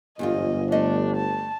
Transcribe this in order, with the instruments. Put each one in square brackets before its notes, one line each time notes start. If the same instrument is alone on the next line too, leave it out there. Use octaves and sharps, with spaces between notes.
[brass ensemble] G1 [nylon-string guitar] E2 G#2 F4 [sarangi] D#5
[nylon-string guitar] A3 D#5 [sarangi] D4
[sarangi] A5